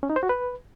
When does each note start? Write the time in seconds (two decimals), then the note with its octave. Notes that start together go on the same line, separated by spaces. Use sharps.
0.03 C#4
0.10 D#4
0.16 C5
0.23 F#4
0.29 B4